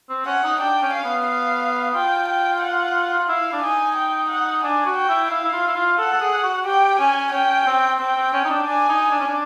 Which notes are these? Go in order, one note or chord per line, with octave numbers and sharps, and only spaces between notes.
C4
C#4 F#5
D#4
D4 G5
C#4
F5
B3
F5
F4 G5
G5
F#5
F4
E4 F5
D4
D#4 G#5
G5
F#5
D4 G#5
F#4
G5
E4
E4 F5
E4
F4
E4
F4
A4 F#5
A4
G#4
F#4
G4 G5
C#4 G#5
C#4 G5
C4
C4 G5
C4
C#4
D#4
D4
D4 G#5
D#4
D4
C#4
D4